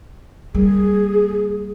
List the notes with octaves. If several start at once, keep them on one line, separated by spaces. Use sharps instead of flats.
G3 A#3 G#4